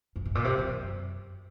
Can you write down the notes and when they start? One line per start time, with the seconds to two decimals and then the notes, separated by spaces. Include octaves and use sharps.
0.16 F#2
0.25 G#2
0.35 A#2
0.44 C3
0.58 F#2